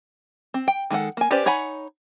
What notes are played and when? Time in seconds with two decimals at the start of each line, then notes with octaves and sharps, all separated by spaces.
0.54 C4
0.68 G5
0.90 D#3 G#3 A4 F#5
1.17 A#3 G#5
1.31 C#4 G4 B4 C5 D5
1.46 D#4 C#5 F#5 G#5 B5